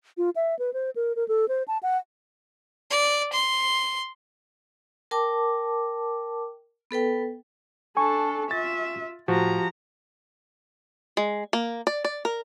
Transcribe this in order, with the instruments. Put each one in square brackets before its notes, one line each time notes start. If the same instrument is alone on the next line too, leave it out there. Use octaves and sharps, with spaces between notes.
[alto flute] F4
E5
B4
C5
A#4
A#4
A4
C5
A5
F#5
[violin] D5
C6
[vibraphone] A#4 G5 A5 D6
B3 A4 B4 G5
[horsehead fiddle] D4 A4 [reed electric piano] G#5 C#6
[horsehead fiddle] F4 E5 [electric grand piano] A6
[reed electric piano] A2 [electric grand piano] F3 F#4 [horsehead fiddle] G4 A#5
[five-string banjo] G#3
A#3
D5
D5
A#4